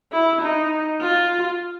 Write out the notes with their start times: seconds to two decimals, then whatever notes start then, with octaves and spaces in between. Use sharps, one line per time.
0.12 E4
0.41 D#4
1.01 F4